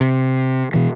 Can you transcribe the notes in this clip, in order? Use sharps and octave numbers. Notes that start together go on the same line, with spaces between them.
C3
B2 E3